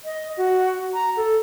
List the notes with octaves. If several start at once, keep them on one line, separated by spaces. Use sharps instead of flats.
D#5
F#4
A#5
A4